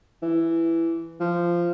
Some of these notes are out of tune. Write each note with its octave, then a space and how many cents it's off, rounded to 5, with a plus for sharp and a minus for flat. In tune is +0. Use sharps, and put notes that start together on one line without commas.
E3 +10
F3 -10